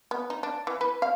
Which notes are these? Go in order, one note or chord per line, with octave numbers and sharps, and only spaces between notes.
B3
D#4
D4
E3
B4
F5